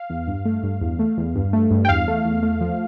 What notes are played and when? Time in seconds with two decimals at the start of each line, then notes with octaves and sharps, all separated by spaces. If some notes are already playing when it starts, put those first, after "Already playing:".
Already playing: F5
0.10 E2
0.27 G2
0.45 A3
0.63 G2
0.81 E2
0.99 A3
1.18 E2
1.35 G2
1.53 A3
1.71 G2
1.85 G5
1.89 E2 F5
2.08 A3
2.25 E2
2.43 A3
2.61 F3